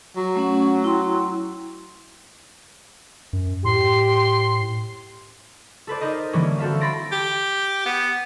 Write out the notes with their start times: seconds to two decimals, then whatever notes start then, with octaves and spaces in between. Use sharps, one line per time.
0.17 F#3
0.35 A3 C#4 F#5
0.84 E4 G5 C6
3.33 F#2
3.64 A2 G4 C6
5.87 A4 B4 C5 D5
6.01 D#4 A#4 C5 D#5
6.33 D3 E3 G3 A#3 C#4
6.59 C4 F#4 A4 E5 F5
6.81 B5 C6 A6 A#6 D7
7.12 G4
7.86 B3